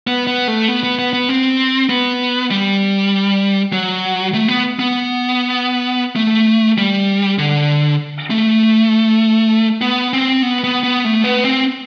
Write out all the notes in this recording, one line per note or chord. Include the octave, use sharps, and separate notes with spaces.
B3
B3
A3
B3
B3
B3
B3
C4
B3
G3
F#3
A3
B3
B3
A3
G3
D3
A3
B3
C4
B3
B3
B3
A3
B3
C4